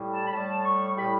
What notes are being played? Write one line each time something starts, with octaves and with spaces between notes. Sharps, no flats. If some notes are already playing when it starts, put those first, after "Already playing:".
Already playing: A2 G3
A5
B5
A2 G3 A5
C#6
A2 G3 B5